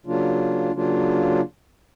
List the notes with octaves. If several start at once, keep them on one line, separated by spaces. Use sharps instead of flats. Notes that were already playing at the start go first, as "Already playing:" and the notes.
C#3 F#3 A#3 D4 F4
C#3 F#3 A#3 D4 F4